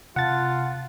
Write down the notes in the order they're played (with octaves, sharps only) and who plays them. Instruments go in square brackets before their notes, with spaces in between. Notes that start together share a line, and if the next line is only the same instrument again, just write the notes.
[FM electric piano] C3 A5 [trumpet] F4 [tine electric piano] F#5 A6